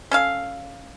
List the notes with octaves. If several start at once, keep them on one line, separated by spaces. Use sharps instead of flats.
C#4 A4 F5